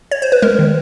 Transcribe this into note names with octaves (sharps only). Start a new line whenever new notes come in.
C#5
C5
B4
G#3 A#4
D#3